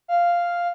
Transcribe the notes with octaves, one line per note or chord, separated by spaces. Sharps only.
F5